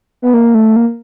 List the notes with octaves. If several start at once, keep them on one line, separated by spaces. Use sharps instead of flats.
B3
A#3
A3
A#3